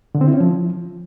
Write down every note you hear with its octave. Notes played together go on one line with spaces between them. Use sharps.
D3
C4
E4
C#4
F3